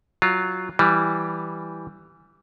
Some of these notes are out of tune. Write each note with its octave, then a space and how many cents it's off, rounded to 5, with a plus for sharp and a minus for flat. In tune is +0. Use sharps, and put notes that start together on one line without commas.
F#3 +0 F4 +0
E3 +0 G3 +0